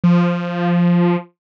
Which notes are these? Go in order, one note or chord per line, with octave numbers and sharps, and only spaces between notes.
F3